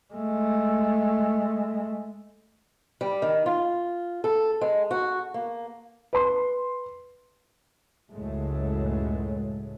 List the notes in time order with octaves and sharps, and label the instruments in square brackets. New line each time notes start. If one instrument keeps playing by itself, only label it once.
[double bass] G#3 A3
[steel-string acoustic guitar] G3
D#3
F4
A4
G#3
F#4
A#3
[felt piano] B4 C6
[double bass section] C#2 F#2 A2 F#3 G#3 A3